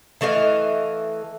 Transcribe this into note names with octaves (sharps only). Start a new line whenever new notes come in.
E3 A3 D#5 F5